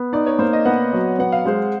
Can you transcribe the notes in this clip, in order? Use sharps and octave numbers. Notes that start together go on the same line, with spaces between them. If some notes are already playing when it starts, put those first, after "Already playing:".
Already playing: B3
D#4 D5
C#5
A#3 C5
D#5
B3 F#5
F#3
B3 F#5
F5
G#3 C5